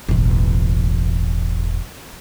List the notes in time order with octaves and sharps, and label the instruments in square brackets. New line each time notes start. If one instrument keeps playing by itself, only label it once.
[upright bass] E1 A1